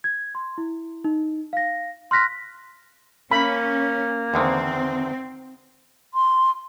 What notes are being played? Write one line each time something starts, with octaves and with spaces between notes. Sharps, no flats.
G#6
C6
E4
D#4
F5 A#6
C6 F6 F#6 A#6 B6
A#3 C#4 B5
E2 D3 D#3 C4
C6